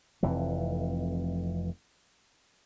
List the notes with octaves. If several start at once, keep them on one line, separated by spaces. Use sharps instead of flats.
F1 F2 E3